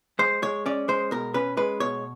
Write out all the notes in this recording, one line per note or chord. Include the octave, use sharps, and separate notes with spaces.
G#3 C5
G#3 C#5
C#4 D5
G#3 C5
B2 A#4
C#4 B4
G#3 B4
B2 C#5